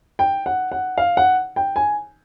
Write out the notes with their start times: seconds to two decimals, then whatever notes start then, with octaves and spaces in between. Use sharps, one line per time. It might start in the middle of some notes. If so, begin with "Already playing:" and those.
0.19 G5
0.46 F#5
0.72 F#5
0.98 F5
1.17 F#5
1.56 G5
1.76 G#5